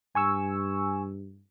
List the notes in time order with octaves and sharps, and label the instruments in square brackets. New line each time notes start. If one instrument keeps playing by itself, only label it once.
[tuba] G2 [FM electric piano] G#5 C#6 E6